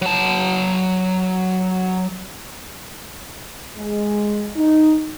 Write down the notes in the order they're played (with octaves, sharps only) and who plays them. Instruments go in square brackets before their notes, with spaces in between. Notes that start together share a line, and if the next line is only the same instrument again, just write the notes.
[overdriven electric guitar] F#3 A5
[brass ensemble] G#3
D#4